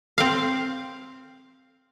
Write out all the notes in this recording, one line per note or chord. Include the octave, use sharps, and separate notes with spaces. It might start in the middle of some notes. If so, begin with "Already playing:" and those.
C4 F5